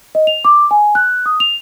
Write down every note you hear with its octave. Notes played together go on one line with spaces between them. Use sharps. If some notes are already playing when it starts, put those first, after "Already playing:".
D#5
F7
D6
G#5
F#6
D#6
F7